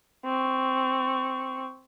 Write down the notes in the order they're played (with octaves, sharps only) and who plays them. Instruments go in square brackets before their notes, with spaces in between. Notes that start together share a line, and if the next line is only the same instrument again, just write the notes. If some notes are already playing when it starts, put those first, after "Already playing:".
[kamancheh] C4 C#6